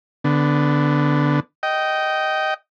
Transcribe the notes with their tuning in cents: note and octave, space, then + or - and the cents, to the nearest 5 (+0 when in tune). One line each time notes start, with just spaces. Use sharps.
D3 +0 B3 +15
D#5 +5 G5 -20